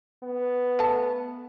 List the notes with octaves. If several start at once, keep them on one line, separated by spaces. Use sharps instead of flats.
B3
A3 A5